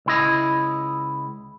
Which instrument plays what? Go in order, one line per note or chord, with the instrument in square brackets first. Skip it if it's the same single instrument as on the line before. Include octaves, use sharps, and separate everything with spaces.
[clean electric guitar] C#2 E4 D#5